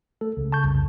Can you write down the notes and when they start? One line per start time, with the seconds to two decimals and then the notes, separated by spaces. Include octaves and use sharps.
0.21 A3 A4
0.37 C#2 C#3
0.52 A5 C#6 G6
0.64 C2 F2